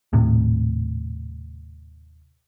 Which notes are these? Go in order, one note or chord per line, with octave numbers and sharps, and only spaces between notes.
D#1 A2 C3